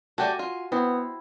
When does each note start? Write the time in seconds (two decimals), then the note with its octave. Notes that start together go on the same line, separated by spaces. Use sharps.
0.18 A3 F#4 G4 D5 G#5
0.39 F4
0.72 B3 C4 E4